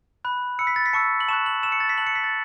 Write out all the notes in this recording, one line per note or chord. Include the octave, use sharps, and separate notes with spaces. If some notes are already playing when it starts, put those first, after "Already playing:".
B5 F#6
B5 E6 C#7
B6
A6
B6
A5 C#6 E6 C#7
F#7
A5 C#6 F#6 E7
F#7
A5 C#6 E6 E7
C#7
A6
B6
A5 F#6 F#7
C#7
B6
A6